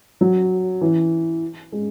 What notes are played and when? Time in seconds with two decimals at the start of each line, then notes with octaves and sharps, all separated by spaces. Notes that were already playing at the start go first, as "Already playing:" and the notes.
0.21 F#3
0.81 E3
1.72 G#3